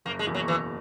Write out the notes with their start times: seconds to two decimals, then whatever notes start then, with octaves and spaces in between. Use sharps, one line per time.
0.05 F#1 A#3
0.19 G#3
0.27 E2 B2 A#3
0.35 F#3
0.48 F#1 E3